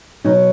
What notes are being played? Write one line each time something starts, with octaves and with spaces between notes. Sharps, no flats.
B2 F#3 D#4